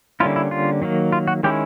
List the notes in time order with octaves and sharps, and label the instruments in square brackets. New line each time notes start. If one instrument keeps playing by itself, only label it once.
[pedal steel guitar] D3 G3 A#3 C#4 E4 F4
E4
F4
D#3 F#3 A#3
F4
F#4
D#3 G#3 C#4 E4 G4